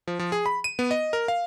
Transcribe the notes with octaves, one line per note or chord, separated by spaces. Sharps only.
F3
F3
G#4
B5
D#7
B3
D#5
A#4
F5